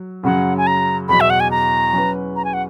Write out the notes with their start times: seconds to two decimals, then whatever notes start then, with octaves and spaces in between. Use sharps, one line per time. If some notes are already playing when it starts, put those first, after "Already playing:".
Already playing: F#3
0.23 F#2 C#3 F#3 F#5
0.58 G#5
0.67 A#5
1.09 E2 B2 F#3 B5
1.21 E5
1.30 F#5
1.40 G#5
1.51 A#5
1.93 F#3 C#4 F#4 B4
2.36 A#5
2.45 G#5
2.54 F#5